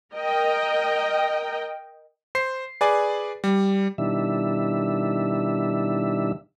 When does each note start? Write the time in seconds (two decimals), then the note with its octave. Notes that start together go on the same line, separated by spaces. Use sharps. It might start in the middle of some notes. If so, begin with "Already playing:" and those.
0.15 A#4 D#5 G5
2.35 C5 C7
2.81 G#4 B4 D5 G#5
3.44 G3
3.98 B2 D#3 G3 D4 E4 E5